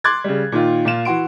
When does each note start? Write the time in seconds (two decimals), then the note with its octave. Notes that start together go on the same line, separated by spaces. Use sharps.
0.04 C6 D6 F#6 G#6 A6
0.24 C#3 G3
0.52 A#2 D#3 F4
0.85 A#2 F4 E7
1.05 E3 F#4 C6 D7